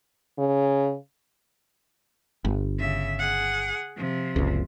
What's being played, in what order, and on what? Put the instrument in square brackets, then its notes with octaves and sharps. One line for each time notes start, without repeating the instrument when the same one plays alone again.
[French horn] C#3
[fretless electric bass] G1
[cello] C#3 E5
G#4 F#5
C3 F3
[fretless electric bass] F#1 C#2